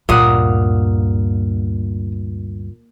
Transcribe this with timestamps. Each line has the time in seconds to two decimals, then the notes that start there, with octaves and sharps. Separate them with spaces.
0.09 D2 G2 A#2 F5 F#5 D#6